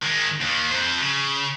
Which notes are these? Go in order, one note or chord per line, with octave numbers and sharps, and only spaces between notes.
D#3 G#3
D#2 D#3
F2 C5
C#3